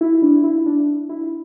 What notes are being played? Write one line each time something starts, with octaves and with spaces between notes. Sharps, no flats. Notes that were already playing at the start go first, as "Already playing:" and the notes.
E4
D4
E4
D4
E4